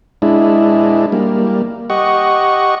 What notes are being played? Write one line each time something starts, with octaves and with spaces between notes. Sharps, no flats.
G#3 D4 E4
G3 A#3
G4 D#5 F#5 C#6